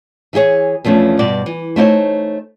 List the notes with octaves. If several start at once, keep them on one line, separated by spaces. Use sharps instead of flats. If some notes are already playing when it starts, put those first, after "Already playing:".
E3 E4 G4 G#4 C#5
E2 F3 A3 C#4 D4
G2 B2 D5
E3
A3 D#4 E4 C5 C#5